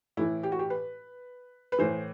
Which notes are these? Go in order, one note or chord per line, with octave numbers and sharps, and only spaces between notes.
A2 E3 E4
G4
F#4
G4
B4
B4
A2 E3 C5